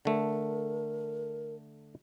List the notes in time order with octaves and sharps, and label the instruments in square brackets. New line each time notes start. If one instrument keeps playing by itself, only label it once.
[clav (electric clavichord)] D3 A3 [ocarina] A#4